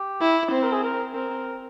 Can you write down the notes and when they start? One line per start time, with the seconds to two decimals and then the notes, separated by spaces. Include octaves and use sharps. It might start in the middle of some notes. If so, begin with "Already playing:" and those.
Already playing: G4
0.21 E4
0.51 C4 C5
0.63 A#4
0.72 G#4
0.83 A#4
1.14 C4 A#4